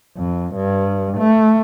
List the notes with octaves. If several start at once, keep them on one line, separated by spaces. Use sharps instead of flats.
F2
G2
A3